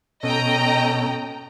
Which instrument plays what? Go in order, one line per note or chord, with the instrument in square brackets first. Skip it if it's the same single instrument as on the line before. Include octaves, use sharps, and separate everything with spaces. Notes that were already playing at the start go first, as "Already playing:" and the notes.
[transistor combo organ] B2 C#4 A4 [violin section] D#5 G5 A#5